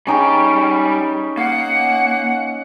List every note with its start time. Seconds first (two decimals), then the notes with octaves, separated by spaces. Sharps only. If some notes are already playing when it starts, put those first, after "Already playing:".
0.07 G3 C#4 D#4 G#4 G5
1.37 A#3 F5 F#5